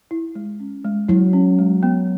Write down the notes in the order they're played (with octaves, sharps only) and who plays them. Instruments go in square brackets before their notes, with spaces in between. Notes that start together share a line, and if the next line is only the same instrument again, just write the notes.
[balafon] E4
G#3
C#4
G#3
[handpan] F#3 [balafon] E4
[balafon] C#4
G#3
B3